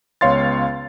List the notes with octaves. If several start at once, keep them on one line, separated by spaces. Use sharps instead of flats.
C#2 B3 C#5 F5 C6 A6